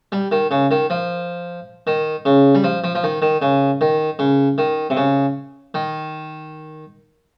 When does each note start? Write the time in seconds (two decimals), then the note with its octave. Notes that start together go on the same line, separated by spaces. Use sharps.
0.12 G3
0.32 D#3
0.51 C#3
0.71 D#3
0.90 F3
1.87 D#3
2.25 C#3
2.55 G3
2.64 F3
2.84 F3
2.95 F3
3.04 D#3
3.22 D#3
3.42 C#3
3.81 D#3
4.19 C#3
4.58 D#3
4.90 C3
4.97 C#3
5.74 D#3